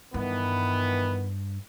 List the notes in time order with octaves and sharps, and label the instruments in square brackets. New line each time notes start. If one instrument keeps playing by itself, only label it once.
[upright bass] G2 [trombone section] D#3 E3 B3